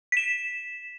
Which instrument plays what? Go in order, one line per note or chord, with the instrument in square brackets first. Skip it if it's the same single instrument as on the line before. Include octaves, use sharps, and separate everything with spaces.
[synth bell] B6 E7